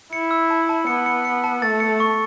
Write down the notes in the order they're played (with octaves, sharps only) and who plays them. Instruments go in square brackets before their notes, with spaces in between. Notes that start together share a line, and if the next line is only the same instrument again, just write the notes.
[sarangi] E4 [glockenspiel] C#7
[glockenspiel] E6
A5
A5
[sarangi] B3 [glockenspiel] C#7
[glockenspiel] C#7
C#7
A5
[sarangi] A3 [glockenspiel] A6
[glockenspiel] C#7
C#6